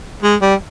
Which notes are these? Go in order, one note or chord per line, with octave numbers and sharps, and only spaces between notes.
G#3
G3